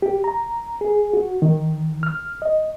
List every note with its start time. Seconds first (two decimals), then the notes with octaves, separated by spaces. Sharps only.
0.02 G4
0.24 A#5
0.81 G#4
1.13 F#4
1.42 D#3
2.03 F6
2.42 D#5